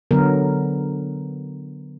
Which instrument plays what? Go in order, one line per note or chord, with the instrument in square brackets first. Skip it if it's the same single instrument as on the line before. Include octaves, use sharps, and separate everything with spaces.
[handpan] D3 F#3 B3 A#4